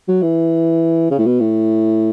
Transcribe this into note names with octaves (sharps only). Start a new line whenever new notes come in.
F#3
E3
C#3
A2
B2
A2